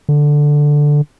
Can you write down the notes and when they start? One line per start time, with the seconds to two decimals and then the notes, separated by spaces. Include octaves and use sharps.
0.09 D3